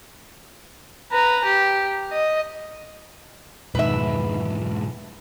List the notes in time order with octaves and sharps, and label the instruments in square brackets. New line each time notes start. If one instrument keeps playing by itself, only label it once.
[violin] B4 A#5
G4
D#5
[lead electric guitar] B1 G#2 [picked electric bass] F2 B2 D#3 [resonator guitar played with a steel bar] B4 E5